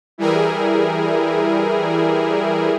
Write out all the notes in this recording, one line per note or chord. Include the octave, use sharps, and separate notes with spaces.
E3 G3 E4 G#4 A#4